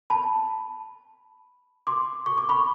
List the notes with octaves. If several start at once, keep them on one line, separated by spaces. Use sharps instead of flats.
A5 B5
C6 D6
C#6
D6
B5 C#6